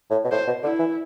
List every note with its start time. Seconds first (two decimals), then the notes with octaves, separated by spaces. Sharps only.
0.10 A2
0.24 B2
0.31 A2 C5
0.47 B2
0.63 D3 E4
0.79 E3